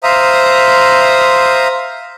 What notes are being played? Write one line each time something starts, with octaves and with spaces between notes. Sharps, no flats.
C5 E5 F5 A#5 D#6